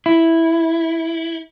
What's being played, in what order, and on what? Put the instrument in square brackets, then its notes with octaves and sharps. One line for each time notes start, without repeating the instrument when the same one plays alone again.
[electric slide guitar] E4